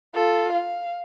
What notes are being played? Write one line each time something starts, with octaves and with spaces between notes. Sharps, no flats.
F4 A4
F5